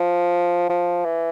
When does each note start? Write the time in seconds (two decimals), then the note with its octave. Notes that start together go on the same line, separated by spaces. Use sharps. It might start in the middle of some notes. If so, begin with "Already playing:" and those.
Already playing: F3
0.69 F3
1.05 E3